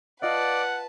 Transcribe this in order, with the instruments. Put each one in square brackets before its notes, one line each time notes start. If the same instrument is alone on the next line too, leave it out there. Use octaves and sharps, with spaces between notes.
[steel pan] F4 D#5 F5 [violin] B4 A5 [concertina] D5 [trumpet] F#5